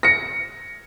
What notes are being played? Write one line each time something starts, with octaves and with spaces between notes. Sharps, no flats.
A#6 C#7